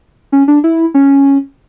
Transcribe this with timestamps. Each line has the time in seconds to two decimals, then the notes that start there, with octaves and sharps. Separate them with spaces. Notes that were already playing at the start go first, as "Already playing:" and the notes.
0.32 C#4
0.48 D4
0.64 E4
0.94 C#4